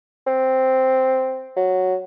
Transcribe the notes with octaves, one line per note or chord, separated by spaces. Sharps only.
C4
F#3